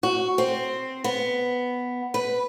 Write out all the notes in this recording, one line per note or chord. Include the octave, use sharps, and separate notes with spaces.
F#4
C4
B3
B4